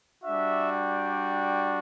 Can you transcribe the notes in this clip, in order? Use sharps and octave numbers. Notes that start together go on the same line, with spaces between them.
G3 D4 F#4 E5
G5